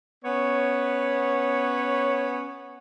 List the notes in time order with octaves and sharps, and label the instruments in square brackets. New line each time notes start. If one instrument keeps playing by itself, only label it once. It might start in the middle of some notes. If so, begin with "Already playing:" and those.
[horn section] B3 C#4 C#5